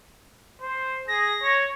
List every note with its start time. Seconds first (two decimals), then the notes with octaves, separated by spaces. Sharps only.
0.62 C5
1.08 G#4 A#6
1.43 C#5